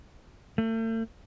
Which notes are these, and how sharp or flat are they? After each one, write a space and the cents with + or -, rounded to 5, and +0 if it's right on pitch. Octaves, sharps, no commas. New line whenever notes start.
A3 +40